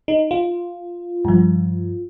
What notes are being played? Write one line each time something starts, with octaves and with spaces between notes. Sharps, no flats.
D#4
F4
G2 F3